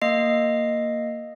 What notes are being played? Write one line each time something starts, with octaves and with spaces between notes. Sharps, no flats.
A#3 D#5 C7